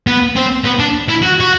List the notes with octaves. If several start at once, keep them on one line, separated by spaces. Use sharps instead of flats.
B3
C4
B3
D4
E4
F#4
F#4